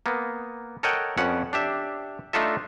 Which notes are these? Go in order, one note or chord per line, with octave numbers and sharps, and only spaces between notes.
A#3 B3
A4 A#4 C#5 D#5 F#5 G5
F2 B3 C#4 F#5
D4 G4 E5
A3 D4 D#4 F4 A4 E5